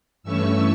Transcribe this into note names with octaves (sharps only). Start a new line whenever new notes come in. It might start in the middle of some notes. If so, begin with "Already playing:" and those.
G2 E3 A3 C#4 C#6 E6